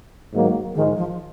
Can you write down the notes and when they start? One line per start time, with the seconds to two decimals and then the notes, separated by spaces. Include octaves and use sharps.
0.33 G#2 D#3 F#3 A#3
0.75 G#2 D#3 F3 G#3
0.97 F3